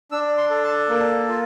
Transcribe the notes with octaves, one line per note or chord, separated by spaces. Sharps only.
D4 E6
C6
A4
A5
A#3
F4